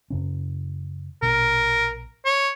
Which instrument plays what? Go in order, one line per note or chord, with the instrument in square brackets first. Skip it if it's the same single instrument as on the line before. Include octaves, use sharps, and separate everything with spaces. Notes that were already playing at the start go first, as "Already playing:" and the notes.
[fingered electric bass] F#2 C#3 C#4
[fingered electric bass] A#1 B2 [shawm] A#4
[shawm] C#5